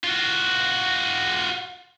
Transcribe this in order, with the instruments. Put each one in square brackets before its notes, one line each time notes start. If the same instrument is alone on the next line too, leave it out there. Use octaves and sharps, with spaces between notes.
[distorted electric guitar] F4 F#4